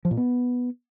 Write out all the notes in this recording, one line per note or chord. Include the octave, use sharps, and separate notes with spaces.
F3
A#2
B3